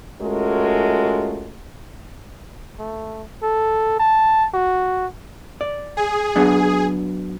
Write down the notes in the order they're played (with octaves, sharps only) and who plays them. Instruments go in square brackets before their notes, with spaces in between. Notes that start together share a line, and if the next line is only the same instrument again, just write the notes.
[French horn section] G#3 A3 C#4 F4 F#4 A#4
[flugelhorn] A3
A4
A5
F#4
[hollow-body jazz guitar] D5
[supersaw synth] G#4
[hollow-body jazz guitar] F#3 B3 D4